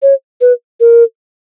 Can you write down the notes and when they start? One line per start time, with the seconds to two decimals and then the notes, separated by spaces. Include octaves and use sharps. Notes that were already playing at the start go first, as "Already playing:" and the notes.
0.02 C#5
0.41 B4
0.80 A#4